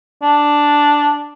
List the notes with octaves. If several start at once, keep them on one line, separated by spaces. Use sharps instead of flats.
D4